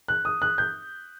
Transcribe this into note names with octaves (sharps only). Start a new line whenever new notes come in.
F#6
D#6
F#6
G6